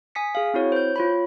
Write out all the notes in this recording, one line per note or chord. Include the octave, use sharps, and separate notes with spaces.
G#5 D#6 B6 C#7
G#4 F5
C4 E4 F#4 C#5
C5 G6
F4 C#5 B5